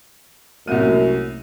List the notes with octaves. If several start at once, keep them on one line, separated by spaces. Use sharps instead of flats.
C2 F#2 A3 A#3 C4 D#7